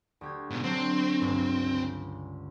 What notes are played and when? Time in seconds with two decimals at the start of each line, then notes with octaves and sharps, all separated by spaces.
0.21 D2 G4 G#6
0.51 G#2 B2
0.64 F#3 C4 D4
1.21 G1 C#2 G2